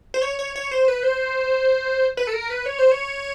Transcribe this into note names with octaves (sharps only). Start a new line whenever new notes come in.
C5
C#5
C#5
C#5
C5
B4
C5
B4
A4
A#4
B4
C#5
C5
C#5